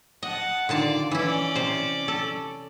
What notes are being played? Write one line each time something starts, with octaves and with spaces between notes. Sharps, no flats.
D#5 F#5 A5
D3 D#3 F4 D5 A5
E3 C#4 E4 D5
C3 C5
A4